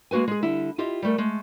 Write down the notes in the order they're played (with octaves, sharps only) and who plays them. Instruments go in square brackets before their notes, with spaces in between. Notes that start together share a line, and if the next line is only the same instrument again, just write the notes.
[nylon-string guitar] G#3 A#3 F#4 B4 G#5
G#3 G#4
D3 G3 E4
E4 F4 G4 D#5
G3 A3 A#4
G#3 A3